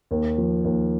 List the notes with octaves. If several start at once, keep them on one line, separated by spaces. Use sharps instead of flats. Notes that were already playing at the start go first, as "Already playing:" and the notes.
D#2
F3
D#2